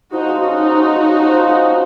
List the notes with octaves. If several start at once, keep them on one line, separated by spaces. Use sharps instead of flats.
F3 D#4 F#4
G#3
C#4 D#4 F#4
F3
F3
G#3
C#4
F3
F3
G#3
C#4